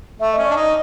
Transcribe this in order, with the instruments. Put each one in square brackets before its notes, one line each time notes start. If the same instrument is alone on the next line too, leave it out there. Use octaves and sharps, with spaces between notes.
[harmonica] A3 [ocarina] E5
[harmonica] C#4 [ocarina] D#5
[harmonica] D4 [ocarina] D5
[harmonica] D#4 [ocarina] D#5